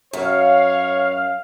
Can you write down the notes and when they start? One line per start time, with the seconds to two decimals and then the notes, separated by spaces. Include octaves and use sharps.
0.13 F#2 C#5 F5